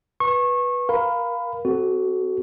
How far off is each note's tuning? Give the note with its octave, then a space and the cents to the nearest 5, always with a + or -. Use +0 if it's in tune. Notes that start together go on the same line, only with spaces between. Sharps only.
B4 -10 C#6 -25
A#4 +15 F5 +0 B5 +20
C4 +0 F#4 +10 A4 -15